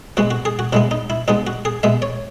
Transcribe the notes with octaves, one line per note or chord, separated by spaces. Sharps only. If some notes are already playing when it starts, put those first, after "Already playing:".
B2 G#3 B3 F#4
F#4
G#4
F#4
B2 G#3 B3 E4
D#4
E4
B2 G#3 B3 D#4
F#4
G#4
B2 G#3 B3 E5
C#5